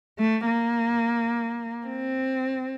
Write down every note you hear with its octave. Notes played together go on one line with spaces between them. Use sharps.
A3
A#3
C4